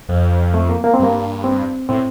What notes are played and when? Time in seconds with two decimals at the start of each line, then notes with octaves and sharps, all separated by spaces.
0.09 F2
0.54 A3
0.69 A#3
0.84 A#3
0.94 C4
0.99 G2 A#3
1.44 C4
1.89 A2 C4